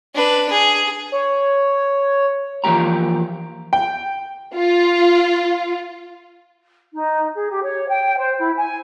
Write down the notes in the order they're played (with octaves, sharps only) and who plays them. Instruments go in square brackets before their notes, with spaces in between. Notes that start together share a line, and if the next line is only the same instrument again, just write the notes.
[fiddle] D4 B4
G#4
[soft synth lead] C#5
[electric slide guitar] E3 F3 A#3 G4 A#5
[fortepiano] G5
[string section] F4
[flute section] D#4
G#4
G4
C#5
G5
C5
E4
G#5